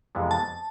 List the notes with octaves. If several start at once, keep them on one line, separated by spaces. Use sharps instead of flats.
F2 C3 E3 G#3 B3
A5